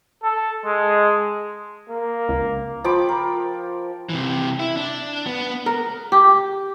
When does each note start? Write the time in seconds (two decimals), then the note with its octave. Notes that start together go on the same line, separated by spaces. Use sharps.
0.23 A4
0.66 G#3
1.90 A#3
2.29 C#2
2.84 F3 G5 B5 D6
3.09 A#4
4.09 C3 E3
4.60 E4
4.77 D4
5.26 B3
5.66 A#4
6.12 G4